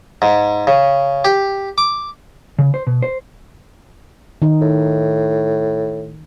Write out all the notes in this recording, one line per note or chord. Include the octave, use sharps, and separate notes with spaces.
G#2
C#3
G4
D6
C#3
C5
B2
C5
D#3 D#4
A2